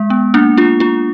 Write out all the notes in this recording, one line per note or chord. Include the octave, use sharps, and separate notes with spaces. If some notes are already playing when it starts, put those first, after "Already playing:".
Already playing: G#3
B3
A#3 D4
D4 F4
D4 F4